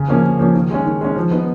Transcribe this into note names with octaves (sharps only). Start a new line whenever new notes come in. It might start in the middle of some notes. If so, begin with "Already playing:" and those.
Already playing: C#3
F3 A#3 C#4
C#3
F3 A#3 C#4
D#3
G#3 C#4
D#3
G#3 C#4
F3
B3 D#4